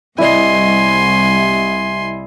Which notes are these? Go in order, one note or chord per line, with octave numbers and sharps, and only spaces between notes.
C2 E4 D5 D#5 G#5 C6